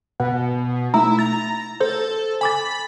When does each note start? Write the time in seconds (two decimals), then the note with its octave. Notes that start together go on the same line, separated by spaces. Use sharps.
0.20 B2 F#5
0.94 A3 D#4 E4 A#5
1.19 A#5 A6
1.80 A4 C5
2.41 G#5 B5 D6 A6